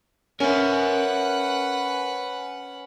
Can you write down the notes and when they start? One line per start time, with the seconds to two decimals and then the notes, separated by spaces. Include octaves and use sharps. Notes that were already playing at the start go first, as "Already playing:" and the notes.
0.40 C#4 A#4 B4 E5 F#5